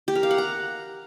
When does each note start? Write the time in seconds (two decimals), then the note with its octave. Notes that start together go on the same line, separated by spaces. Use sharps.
0.08 G4
0.15 A#4
0.23 F5
0.31 F#5
0.38 A#5